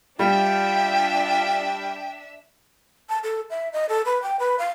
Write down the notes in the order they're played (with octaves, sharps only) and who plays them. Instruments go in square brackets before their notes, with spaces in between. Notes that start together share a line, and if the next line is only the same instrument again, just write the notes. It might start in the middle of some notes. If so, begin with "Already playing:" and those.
[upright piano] G3 [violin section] D4 E5 [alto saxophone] F4 [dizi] G5
[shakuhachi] A5
A4
E5
D#5
A4
B4
G5
B4
F5